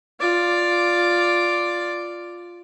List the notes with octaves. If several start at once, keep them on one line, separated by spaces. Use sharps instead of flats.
F4 D5